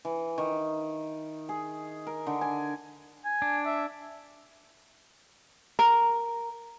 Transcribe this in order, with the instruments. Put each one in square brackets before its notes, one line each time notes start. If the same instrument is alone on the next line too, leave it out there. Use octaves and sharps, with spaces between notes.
[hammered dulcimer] E3
D#3
G#4
A#4
D3
G#5
[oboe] G#5
[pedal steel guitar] D4
[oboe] E5
[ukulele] A#4